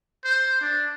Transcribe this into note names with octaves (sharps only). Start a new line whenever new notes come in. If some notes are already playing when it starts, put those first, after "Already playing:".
C5
D4